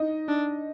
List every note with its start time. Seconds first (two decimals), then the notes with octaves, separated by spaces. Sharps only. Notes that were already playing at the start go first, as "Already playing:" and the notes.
Already playing: D#4 D#5
0.28 D4